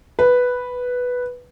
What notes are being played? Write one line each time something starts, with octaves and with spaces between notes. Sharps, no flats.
B4